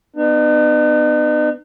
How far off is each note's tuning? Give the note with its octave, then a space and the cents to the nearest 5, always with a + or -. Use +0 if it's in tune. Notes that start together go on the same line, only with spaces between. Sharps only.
B3 +10 D#4 -45